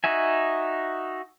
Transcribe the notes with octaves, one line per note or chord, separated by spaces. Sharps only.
D#4 F#4 E5 G#5